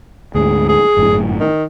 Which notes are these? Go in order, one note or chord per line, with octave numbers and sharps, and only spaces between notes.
D2 G#2 G#3 G#4
G#4
G1 F#2 A2
D#3